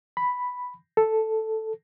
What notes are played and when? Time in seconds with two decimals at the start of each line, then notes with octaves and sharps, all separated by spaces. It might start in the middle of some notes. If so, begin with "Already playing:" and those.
0.17 B5
0.97 A4